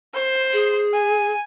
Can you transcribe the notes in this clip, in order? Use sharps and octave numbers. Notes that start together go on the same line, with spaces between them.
C5
G#4
G#5